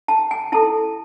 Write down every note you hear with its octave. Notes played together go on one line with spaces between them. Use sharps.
A5
G#5
E4 A4 A5